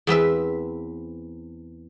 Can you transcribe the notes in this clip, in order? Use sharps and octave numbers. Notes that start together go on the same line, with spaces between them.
E2 C4 B4 E5